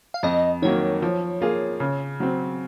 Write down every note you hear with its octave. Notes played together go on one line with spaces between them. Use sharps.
F5
F2 D#5
D#3 F#3 A#3 C#5
F3
A#3 F4 G#4
C#3
F#3 C4